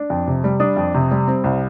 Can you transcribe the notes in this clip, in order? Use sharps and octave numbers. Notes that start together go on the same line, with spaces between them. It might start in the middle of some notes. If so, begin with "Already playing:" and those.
Already playing: D4
F2
C3
G3
D4 D#6
F2
C3
G3
C4
C2